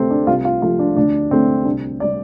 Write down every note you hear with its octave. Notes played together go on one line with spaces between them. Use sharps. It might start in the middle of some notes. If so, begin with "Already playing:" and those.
Already playing: D2 C3 A3 C4 A4
D4
C2 F4
F4
C3 F3 A3 F4
D4
D2 D4
D3 A3 C4
C2 D4
C3 G3 D5